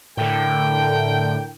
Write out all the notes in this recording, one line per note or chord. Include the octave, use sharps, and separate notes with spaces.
A2 D3 A4 A#4 G5